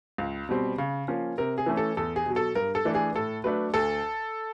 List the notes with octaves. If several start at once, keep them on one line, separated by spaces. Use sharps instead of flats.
C#2
B2 G3 C4
C#3
F3 A#3 C#4
C3 A#4
G#4
E3 A3 C#4
A4
E2 A4
G#4
B2 F#3
A4
G2 A#4
A4
E3 A3 D4
G#4
A2 A4
F#3 A3 D4 B4
D2 A4